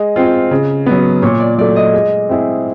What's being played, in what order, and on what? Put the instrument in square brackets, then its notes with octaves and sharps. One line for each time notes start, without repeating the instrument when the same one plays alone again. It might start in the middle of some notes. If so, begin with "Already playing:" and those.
Already playing: [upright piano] G#3 [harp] D#5
[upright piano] C4 F4
C#3
F#3 B3
[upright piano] A#2 [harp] C#5
[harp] D5
[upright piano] F#3 A3 [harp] D5
[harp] D#5
[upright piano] G#3
C4 E4 G#4